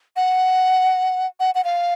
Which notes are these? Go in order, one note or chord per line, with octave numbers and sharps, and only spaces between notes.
F#5
F#5
F#5
F5